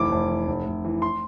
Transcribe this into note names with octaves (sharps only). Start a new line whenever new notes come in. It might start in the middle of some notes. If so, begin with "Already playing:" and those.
Already playing: F1 E3 D6
F1
E3
F1
F1
E3
C6